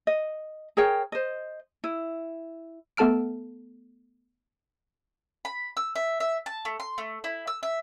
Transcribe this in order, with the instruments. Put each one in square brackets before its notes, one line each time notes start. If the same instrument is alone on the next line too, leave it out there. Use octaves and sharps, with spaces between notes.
[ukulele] D#5
G#4 A#4 C#5 G5
C5 D#5
E4
[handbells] A3 B3 A4 A5 F6 D7
[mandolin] B5
E6
E5
E5
A5
A3
C6
A3
E4
E6
E5